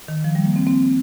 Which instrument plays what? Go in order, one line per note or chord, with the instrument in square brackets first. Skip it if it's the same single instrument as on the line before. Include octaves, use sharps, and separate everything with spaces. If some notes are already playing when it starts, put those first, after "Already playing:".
[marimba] D#3
F3
G3
A#3
C4
C4